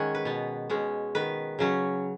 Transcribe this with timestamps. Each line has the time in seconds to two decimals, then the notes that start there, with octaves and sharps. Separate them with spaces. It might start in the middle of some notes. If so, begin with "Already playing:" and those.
Already playing: D#3 G#3 C#4 F#5 G#5
0.15 B4
0.25 B2 B3
0.70 B2 G#3 C#4
1.15 D#3 B3 B4
1.59 C#3 F#3 C#4